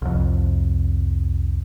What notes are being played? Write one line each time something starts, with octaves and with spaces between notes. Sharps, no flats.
C2 F2